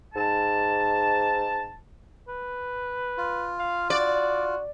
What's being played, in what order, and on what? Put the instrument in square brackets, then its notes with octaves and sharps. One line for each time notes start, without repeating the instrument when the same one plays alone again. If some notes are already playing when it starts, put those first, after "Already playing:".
[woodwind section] G#2 A5
[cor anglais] B4
[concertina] F4
[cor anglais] F5
[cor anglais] F#4 [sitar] D5